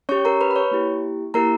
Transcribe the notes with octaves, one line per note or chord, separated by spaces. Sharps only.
C#4 G4 C#5 C#6
A#4 A#5
B4 B5
B5
C#5 C#6
A#3 E4 G4
A#3 E4 G4 A#4 A#5